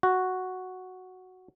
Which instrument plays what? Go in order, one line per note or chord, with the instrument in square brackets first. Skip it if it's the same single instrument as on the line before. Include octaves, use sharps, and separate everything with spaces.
[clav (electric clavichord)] F#4